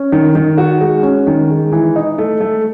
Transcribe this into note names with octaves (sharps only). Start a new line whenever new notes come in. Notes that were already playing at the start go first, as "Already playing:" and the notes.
Already playing: C#4
D#3
D#3
F#4
G#3
C#4
D#3
G#3
E3
D#4
A3
A3